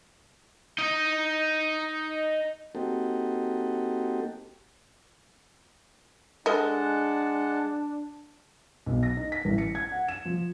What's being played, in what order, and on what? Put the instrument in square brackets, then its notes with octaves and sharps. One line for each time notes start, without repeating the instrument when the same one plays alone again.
[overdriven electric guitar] D#4 D#5
[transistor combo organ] A#3 C4 D#4 F#4 G4 A4
[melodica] G#3 F#5 A5 [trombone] D4 [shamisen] A4 A#4 D#5
[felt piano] B1
A#6
D#4
B6
A1
C#7
G#6
F#5
E7
F3